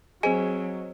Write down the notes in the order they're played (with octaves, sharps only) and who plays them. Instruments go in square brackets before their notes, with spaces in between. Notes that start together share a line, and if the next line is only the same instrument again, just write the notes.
[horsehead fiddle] F#3 [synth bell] C4 C5 D#5 [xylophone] G#4 G#5